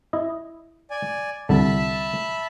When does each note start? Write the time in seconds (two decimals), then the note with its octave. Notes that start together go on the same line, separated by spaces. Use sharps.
0.13 E4 D#5
0.90 D5 G#5
1.49 C2 D3 E5 A5 B5